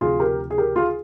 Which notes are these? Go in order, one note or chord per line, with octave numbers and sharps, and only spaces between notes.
D2 C3 F3 F4 G#4
G4 A#4
G#4
G4 A#4
F4 G#4